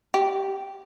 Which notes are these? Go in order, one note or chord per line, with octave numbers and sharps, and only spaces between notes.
G4